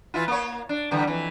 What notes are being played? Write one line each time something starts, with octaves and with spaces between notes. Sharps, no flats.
E3 E4 F4
A#3 C#5
D4
D3 E3 G3
F2 E3